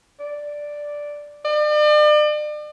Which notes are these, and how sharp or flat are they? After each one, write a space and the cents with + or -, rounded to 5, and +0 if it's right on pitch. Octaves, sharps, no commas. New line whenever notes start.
D5 +0
D5 +40